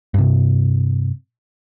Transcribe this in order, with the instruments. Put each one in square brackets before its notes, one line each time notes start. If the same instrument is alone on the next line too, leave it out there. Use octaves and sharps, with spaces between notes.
[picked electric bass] G2 C3